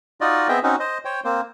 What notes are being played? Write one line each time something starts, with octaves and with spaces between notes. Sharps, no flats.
D#4 F4 F#4 D5 D#5
B3 C4 G#4 D#5 E5 G5
C4 C#4 D#4 F#4
C5 D#5
C5 C#5 G5
A#3 C4 C5